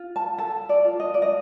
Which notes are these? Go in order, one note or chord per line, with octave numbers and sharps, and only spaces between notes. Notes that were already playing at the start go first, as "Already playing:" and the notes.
Already playing: F4
A5
A4 A5
D5
F4
D#5
D5
D#5